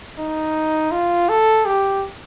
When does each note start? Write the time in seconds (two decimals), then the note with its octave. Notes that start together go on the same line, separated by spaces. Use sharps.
0.18 D#4
0.92 F4
1.29 A4
1.66 G4